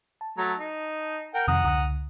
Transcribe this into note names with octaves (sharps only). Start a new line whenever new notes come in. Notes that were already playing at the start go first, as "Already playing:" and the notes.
A5
F#3 A3 A#5
D#4
A#4 F#5 G5
F2 C3 D#3 F#5 A#5 D#6
C#2 D3